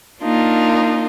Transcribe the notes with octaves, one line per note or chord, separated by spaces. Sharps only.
A#3 D4 D#4 F4 A#4